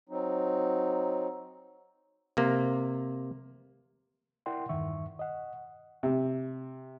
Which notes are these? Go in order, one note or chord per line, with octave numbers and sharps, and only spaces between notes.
F#3 C4 D#4
C3 A#3
E4 A#4 D5 F#5 G5 C6
E2 G2 D#3 E5 C#6
D#5 F#5
C3